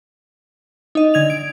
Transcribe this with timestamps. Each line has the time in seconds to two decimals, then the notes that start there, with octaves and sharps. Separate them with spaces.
0.95 D#4 D#5
1.14 D3 G#6 F7
1.30 D7